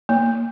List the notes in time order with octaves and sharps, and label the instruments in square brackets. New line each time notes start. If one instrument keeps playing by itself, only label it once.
[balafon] A#3